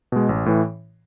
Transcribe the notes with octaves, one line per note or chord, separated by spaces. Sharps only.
B2 G#3
A1
A2 E3